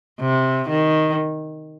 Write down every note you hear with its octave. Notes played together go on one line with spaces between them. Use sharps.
C3
D#3